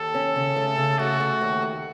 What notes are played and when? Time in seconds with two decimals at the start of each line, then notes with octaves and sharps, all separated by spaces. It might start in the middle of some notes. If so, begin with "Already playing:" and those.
Already playing: D#2 A4
0.14 C#4
0.36 C#3
0.56 A3
0.78 C#3
0.98 A3 F#4
1.20 A3
1.41 D#2
1.62 D#2